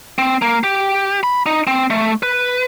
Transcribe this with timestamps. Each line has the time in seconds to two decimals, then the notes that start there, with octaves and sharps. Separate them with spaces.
0.18 C4
0.42 A#3
0.63 G4
1.23 B5
1.46 D#4
1.67 C4
1.90 A3
2.23 B4